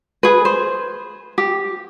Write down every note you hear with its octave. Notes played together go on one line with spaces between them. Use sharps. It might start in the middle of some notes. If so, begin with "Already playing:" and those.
G#4 B4
C5
G4